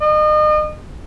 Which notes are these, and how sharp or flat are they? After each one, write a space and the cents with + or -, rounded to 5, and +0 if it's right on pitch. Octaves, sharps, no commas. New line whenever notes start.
D#5 -35